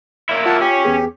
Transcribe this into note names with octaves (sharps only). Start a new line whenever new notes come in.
A#3 E4
F4 F#5 A5
C#4 G4
E2 B3 G#4